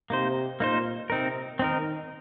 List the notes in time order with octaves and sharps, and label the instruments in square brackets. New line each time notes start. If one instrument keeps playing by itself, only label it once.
[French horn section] C3 [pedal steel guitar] A#3 D#4 C5
[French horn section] A#2 [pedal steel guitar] A#3 D#4 C5
[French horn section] C3 [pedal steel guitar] C4 D#4 A#4
[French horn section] D#3 [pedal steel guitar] C4 D#4 A#4